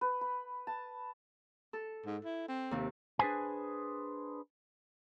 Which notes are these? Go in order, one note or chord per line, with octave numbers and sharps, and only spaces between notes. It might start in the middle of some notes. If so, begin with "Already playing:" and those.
B4
B5
A5
A4
G#2
E4
C4
D#2 C3
D4 G#4 B4 C5 G#5